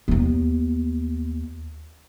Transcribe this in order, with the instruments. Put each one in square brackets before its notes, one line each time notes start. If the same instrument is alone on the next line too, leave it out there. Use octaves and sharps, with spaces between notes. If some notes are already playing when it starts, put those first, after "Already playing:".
[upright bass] D#2 B3